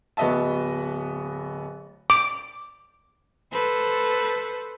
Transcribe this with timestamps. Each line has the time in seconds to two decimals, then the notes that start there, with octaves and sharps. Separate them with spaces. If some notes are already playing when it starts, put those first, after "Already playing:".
0.17 D1 B3 F#4 D#5 E5 A5
2.10 D6
3.52 A4 B4 C5